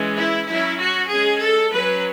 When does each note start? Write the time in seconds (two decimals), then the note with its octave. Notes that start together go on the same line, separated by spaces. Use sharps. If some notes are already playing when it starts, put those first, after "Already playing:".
Already playing: E3 G#3 C#4
0.18 E4
0.49 F#3 C#4 E4
0.80 F#4
1.11 G#3 C#4 G#4
1.42 A4
1.73 F#3 C#4 B4